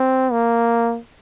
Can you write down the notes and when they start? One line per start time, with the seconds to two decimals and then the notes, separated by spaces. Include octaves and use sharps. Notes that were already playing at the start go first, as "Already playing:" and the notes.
Already playing: C4
0.32 A#3